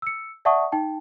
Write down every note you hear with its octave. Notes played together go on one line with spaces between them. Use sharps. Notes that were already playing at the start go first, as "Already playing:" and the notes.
E6 C#7
D5 E5 F#5 A5 C#6 D#6
D#4 G5 A5